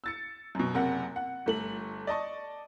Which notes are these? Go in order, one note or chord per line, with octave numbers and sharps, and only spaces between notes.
E6 A6 C#7
F#2 B2
F#1 C3 A#4 F#5
F#5
G1 A3 F#7
D5 D#5 A5 C#6